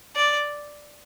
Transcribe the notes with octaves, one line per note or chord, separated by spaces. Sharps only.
D5